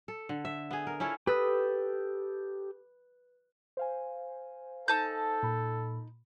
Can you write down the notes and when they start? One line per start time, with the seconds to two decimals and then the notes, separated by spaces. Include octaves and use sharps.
0.08 A4
0.29 D3
0.45 E5
0.71 B3 G#4
0.87 A#4
1.00 C#4 E4 F4 A4
1.27 G4 A4 B4 D#6
3.77 C5 F5 G#5
4.88 D#4 A4 A5 G6
5.43 A#2 B5